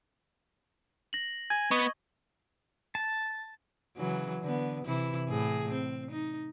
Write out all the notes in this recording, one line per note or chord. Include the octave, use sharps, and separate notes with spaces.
A#6 F#7
G#5 G#6
B3 D#5 C#6
A5
C#3 E3 F#3
D3 B3
C3 E3 E4
A2 G#4
C4
D#4